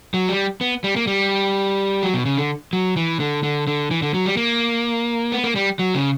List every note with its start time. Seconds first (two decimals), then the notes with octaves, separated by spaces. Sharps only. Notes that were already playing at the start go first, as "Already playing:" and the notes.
0.14 F#3
0.29 G3
0.61 B3
0.84 G3
0.96 A#3
1.07 G3
2.03 F#3
2.14 B2
2.25 C#3
2.37 D3
2.73 F#3
2.96 E3
3.20 D3
3.43 D3
3.67 D3
3.91 E3
4.02 D3
4.14 F#3
4.26 G3
4.37 A#3
5.32 B3
5.44 A#3
5.56 G3
5.79 F#3
5.95 C#3